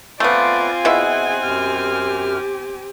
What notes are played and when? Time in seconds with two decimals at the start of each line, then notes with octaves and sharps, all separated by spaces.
0.20 A3 B3 C4 F4 D5 F5 G#5
0.85 B2 E4 G#4 E5 F#5
1.43 F#2 G4 F6